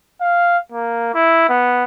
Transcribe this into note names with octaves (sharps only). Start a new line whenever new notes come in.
F5
A#3
E4
B3